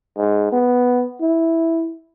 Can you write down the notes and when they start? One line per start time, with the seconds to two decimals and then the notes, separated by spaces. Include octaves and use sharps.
0.17 G#2
0.52 B3
1.21 E4